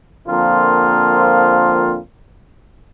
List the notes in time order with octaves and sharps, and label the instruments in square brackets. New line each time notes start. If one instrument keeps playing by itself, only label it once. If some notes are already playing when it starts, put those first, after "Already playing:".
[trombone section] D3 F3 A#3 C4 F4 A#4